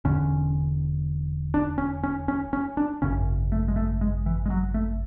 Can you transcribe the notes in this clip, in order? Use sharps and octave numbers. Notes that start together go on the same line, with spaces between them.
E1 E2 D3 C#4
D4
C#4
C#4
C#4
C#4
D4
G#1 F#2 C#3 C#4
A3
G#3
A3
G#3
E3
G#3
F#3
A3